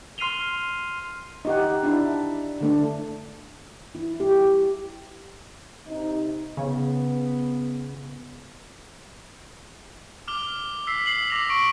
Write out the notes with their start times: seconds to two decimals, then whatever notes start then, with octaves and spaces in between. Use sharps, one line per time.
0.18 C6 F6 C7 D#7 F7 G7
1.45 D#4 G4 F#5
1.83 D4 E4
2.61 D3 A3 D4
3.95 E4
4.20 G4
5.86 C3 D#4
6.57 C#3 B3
10.28 D6 F6 F7 G7
10.87 E6 B6 C7
11.06 C7 F#7
11.30 D6 A#6 C7 F7
11.49 C#6 D7